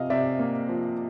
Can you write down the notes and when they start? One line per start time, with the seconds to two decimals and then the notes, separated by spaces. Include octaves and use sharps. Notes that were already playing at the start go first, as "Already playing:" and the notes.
Already playing: C3 F3 D#5 F5
0.10 C3 D5 E5
0.39 A#3
0.69 F3